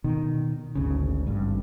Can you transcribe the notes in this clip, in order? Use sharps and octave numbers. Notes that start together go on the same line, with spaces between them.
B2 D#3
G#1 D2 C#3
G#1 G2